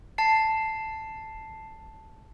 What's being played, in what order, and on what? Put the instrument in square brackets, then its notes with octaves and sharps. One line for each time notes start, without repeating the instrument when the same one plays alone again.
[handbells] A5 C7